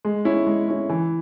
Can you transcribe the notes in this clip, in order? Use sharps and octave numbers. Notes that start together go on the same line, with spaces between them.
G#3
C#4 E4
G#3
C#4 E4
E3